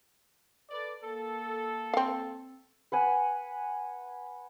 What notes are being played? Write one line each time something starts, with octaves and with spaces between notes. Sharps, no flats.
A4 B4 D5
A#3 A4
C4 F5
B4 F#5 G#5